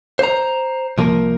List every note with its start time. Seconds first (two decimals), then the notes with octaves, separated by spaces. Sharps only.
0.19 C5 A#5
0.98 C2 F3 A#3 A#4